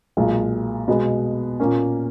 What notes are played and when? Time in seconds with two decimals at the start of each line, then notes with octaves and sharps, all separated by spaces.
0.17 B1 A#2 G#3
0.88 B2 G#3 B3
1.60 A#2 A#3 C#4